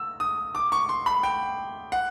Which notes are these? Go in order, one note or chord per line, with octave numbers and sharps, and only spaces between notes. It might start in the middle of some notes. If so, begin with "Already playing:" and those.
Already playing: E6
D#6
D6
C#6
C6
B5
G5
F#5